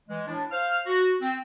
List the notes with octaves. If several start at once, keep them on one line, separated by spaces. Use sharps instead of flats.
E3 G#3
A2 D4
C5 F5 F6
F#4
C4